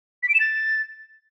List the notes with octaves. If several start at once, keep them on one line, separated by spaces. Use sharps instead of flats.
B6
D7
E7
A6